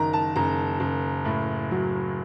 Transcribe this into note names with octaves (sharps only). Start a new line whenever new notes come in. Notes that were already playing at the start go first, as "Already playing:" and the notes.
Already playing: F#1 D#3 A#5
A5
F#1 A#5
F#1
A2
F#3